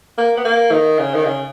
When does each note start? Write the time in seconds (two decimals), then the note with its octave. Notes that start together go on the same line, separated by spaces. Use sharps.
0.18 A#3
0.37 B3
0.45 A#3
0.72 D#3
0.99 C#3
1.14 D#3
1.25 C#3